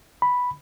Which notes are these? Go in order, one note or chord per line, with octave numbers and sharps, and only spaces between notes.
B5